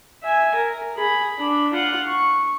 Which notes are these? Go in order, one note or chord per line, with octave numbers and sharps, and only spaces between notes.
E5 G#5
A#4
G#4 B5
D4 B5
F4 F#5
C#6